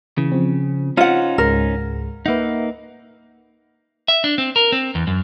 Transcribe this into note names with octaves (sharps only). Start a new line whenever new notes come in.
C#3 E3
F3 C4
C#4 D#4 F4 C5 F#5
C#2 G#2 G#3 A#4
A#3 D#4 B4 E5 F#5
E5
D4
C4
A#4
C4
E2
F#2